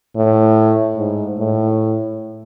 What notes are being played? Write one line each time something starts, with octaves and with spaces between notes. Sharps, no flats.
A2
G#2
A2